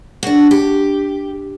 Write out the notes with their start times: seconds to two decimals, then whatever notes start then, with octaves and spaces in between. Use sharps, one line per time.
0.23 D4 F#4
0.51 G4